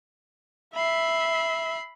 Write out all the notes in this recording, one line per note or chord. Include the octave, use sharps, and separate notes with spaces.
E5 B5 C7